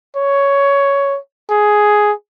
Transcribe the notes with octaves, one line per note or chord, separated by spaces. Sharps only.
C#5
G#4